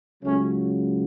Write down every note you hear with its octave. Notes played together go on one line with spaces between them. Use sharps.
C#2 C#3 F#3 A3 C#4